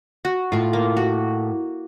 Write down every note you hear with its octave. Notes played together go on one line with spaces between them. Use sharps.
F#4
A2 F4 C#6
A#3
F#4